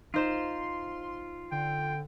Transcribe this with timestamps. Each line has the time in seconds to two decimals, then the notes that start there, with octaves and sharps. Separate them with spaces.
0.14 D#4 F4 C5 C6 E7
1.52 D3 G5